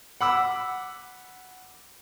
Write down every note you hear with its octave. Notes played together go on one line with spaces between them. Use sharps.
F#5 B5 D6 E6